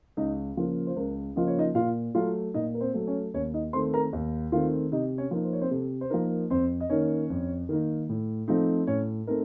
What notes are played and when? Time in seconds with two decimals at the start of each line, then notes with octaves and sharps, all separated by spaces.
0.17 C#2 D#4 D#5
0.57 C#3 F3 A#3 F4
0.87 C5
0.96 C#2 A#4
1.36 C#3 F3 A#3 F4 D#5
1.47 C#5
1.58 D#4 D#5
1.75 A#2 F4 F5
2.15 F#3 A3 F4 F5
2.54 A#2 D#4 D#5
2.74 A#4
2.81 C4 C5
2.94 F#3 A3
3.07 C#4 C#5
3.34 D#2 C#4 C#5
3.54 D#4 D#5
3.73 D#3 A3 C4 C5 C6
3.94 A#4 A#5
4.13 D#2
4.52 D#3 A3 C4 F4 F5
4.92 C3 D#4 D#5
5.18 C#4 C#5
5.31 F3 A#3 D#4
5.45 C5
5.53 C#5
5.61 C4 C5
5.71 C3 A4
6.01 C5
6.10 F3 A#3 D#4 A#4
6.50 F2 C4 C5
6.81 D#5
6.90 D#3 A#3 C#4 D#4 C#5
7.30 F2
7.69 D#3 A#3 D#4
8.09 A2
8.48 F3 A3 C4 D#4
8.87 A2 C#4 C#5
9.27 A3 C4 D#4 A#4